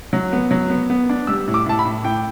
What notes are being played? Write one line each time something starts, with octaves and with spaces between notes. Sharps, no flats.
F#3
B3
F#3
B3
B3
D4
G3 E6
A2
D6
A2 A5
B5
A2
A2 G5